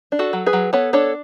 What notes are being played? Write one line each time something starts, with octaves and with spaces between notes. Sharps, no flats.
D4
F#4 A4
F#3
G#4 B4
F#3
B3 A4 C#5
D4 A4 C#5